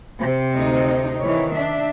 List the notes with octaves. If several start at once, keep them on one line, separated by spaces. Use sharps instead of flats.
C3 C4
D2 D#4
D#3 E3 C#5
D4 E5